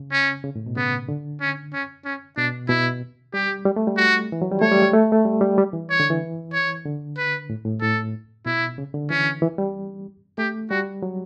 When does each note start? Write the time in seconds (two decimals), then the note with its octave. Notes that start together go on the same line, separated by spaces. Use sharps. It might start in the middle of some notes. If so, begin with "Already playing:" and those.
Already playing: C#3
0.12 C#4
0.44 C#3
0.56 A2
0.66 B2
0.76 C#3 B3
1.09 D3
1.41 C#4
1.73 C#4
2.05 C#4
2.37 B2 D4
2.69 B2 E4
3.34 G3 G4
3.65 G3
3.76 A3
3.87 G3
3.97 F#4
4.32 E3
4.42 F#3
4.52 G3
4.61 A3 C#5
4.71 G3
4.82 G3
4.93 A3
5.12 A3
5.25 G3
5.41 G3
5.58 G3
5.73 E3
5.90 C#5
6.00 D3
6.10 E3
6.53 C#5
6.85 D3
7.18 B4
7.50 A2
7.65 A2
7.81 A2 A4
8.46 B2 E4
8.78 C#3
8.94 D3
9.10 E3 C#4
9.42 E3
9.58 G3
10.38 A3 G4
10.70 G3 F#4
11.03 F#3